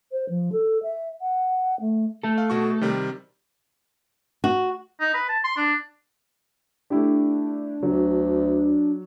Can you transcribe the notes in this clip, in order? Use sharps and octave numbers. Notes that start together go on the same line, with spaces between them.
C5
F3
A4
E5
F#5
A3
A3 A4
F5
B2 F#4 C#6
C3 D#3 G3
F#4
D#4
B4
A5
C6
D4
A3 D4 E4 G4
D2 F#3